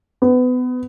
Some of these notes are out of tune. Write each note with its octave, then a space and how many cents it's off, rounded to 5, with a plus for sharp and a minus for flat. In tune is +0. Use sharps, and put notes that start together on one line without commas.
B3 +25